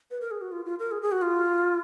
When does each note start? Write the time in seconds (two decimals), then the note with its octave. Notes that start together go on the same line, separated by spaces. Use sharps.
0.11 B4
0.21 A#4
0.31 G#4
0.41 F#4
0.52 F4
0.65 F4
0.79 A#4
0.91 G#4
1.02 G#4
1.12 F#4
1.22 F4